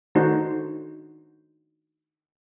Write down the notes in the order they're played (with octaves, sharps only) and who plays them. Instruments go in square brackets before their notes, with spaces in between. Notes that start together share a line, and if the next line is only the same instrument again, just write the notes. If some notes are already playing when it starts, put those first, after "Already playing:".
[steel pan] D#3 A3 D4 D#4 F#4 C5